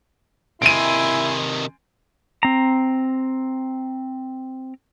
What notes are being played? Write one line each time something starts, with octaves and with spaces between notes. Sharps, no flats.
C3 D#3 E4 G#5 C6 D7 D#7
C4 A#5